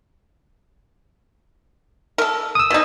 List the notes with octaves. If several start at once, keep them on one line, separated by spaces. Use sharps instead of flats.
A4 A#4
D#6 E6
B2 D#4